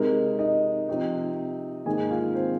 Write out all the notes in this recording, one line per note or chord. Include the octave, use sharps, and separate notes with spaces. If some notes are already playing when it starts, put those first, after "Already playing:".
Already playing: C3 G#3 D#4 A#4
D#4 D#5
C3 F3 C4 D#4
G#2 D#3 A#3 D#4 G#4 G#5
F4 F5
C4 C5